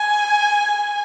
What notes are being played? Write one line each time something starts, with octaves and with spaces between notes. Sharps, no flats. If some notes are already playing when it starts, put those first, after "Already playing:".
Already playing: G#5